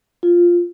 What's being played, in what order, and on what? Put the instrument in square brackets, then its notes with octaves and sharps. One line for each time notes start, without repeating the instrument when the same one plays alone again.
[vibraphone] F4